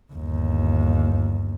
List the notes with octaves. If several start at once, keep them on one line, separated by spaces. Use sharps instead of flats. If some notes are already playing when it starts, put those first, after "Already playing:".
G1 D#2